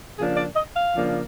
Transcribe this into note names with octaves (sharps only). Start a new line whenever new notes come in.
C#3 F3 A#3 D4 G#4
D5
D#5
F5
C#3 F3 A#3 D4